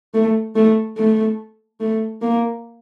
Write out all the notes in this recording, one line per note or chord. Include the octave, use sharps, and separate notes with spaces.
A3
A3
A3
A3
A#3